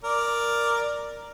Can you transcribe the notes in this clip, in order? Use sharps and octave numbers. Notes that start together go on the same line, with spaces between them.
A#4 D5